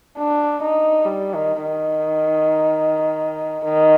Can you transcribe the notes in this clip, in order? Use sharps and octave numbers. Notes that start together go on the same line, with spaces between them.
D4
D#4
G3
D#3
D#3
D#3